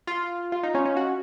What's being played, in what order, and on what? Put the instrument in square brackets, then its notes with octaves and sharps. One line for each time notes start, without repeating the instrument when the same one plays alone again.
[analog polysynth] F4
F4
D#4
C#4
C#4
F#4